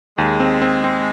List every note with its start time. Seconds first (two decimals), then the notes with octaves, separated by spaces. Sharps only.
0.18 D#2 G#3
0.40 C4
0.62 C4
0.84 C4